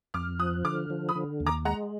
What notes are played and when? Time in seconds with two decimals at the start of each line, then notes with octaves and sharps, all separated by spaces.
0.14 F2 D6 F6
0.39 F3 D#6 F#6
0.65 D3 D6 F6
0.90 F3
1.09 B5 D#6
1.15 D3
1.40 D#2
1.46 A#5 D6
1.65 G#3 F#5 A#5